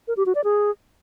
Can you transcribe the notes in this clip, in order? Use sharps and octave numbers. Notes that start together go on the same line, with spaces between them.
A#4
G4
F#4
D5
G#4